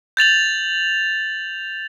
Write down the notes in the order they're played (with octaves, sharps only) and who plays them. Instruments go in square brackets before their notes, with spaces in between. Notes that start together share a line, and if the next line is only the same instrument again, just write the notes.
[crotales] G6 A6 F7 F#7